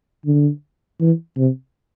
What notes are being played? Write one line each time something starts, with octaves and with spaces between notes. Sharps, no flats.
D3
E3
C3